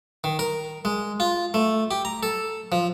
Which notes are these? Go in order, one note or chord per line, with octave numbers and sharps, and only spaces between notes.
D#3
A#4
G#3
F4
A3
G4
A#5
A4
F3